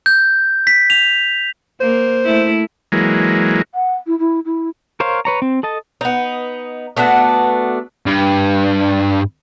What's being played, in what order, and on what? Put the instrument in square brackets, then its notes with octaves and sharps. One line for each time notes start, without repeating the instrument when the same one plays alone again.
[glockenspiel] G6
B6
F7
[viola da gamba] A#3 [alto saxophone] C5
[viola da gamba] A3 E4
[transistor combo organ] E3 F#3 G#3 A#3
[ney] F#5
E4
E4
E4
[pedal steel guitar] A#4 C5 C#5 F5
B4 C#5 A#5
C4
A4 D#5 A5
[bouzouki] B3 D#4
A3 B3 D4 F#4
[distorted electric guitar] G2